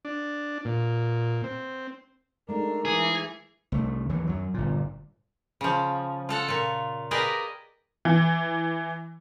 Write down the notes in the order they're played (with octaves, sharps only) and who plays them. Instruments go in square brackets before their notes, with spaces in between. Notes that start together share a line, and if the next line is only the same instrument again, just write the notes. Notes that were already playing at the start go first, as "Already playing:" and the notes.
[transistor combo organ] D4
A#2
C4
[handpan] G#3 A3 D#4 [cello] D4 [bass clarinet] A#4
[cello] E3 [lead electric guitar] G#4
[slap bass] C2 A3
D#2 E3 F#3
F#2 F#3
G1 A#2
[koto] C#3 F3
F4 A4 F#5
A#2 F4
G4 G#4 A#4 B4 D5 D#5
[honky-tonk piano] E3